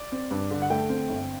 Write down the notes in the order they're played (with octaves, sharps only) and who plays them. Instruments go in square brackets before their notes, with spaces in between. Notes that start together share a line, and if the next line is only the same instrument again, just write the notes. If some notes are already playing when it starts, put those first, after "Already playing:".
Already playing: [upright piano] D5
C4
G2
D3
F#5
A3 G5
C4
G1